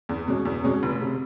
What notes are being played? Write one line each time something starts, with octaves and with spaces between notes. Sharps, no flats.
E2
B2 G#3 C#4
E2
B2 G#3 C#4
F1
C3